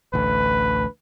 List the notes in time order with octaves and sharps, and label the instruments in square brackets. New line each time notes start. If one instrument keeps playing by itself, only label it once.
[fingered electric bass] A1 D2 [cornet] B4